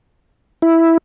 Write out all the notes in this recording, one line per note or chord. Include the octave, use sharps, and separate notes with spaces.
E4